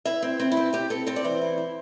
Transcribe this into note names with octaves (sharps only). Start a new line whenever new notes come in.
E4 E5
C4
C4
E4
C4
C4 G4
C4 A4
C4 A4
D5
E3 C5
E4
E4